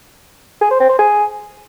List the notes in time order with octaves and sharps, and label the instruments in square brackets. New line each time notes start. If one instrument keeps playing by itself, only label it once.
[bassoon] G#4
C5
C4
C5
G#4